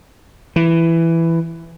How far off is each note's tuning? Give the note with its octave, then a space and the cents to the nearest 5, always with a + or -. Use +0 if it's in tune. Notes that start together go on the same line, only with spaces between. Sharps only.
E3 +10